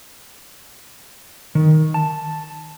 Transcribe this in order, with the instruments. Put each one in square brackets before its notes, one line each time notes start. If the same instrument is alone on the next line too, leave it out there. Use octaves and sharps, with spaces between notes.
[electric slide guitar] D#3
A5